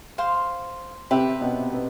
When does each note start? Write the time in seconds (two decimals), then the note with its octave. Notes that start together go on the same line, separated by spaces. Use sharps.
0.18 C5 F5 C6
1.11 C3 C4 G4 B4 E5 B5
1.41 B2 B3
1.72 B2 B3